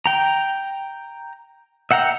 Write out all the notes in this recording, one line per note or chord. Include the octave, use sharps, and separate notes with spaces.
G5 A#5
E5 F#5 G5 A#5